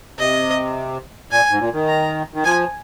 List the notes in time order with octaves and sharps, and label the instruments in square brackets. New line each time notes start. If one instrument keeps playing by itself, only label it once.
[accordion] C3 [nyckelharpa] D#5
[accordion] A#2 [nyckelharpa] G#5
[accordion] G#2
A#2
D#3
[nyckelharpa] A#5
[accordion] D#3
[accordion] F3 [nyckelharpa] G#5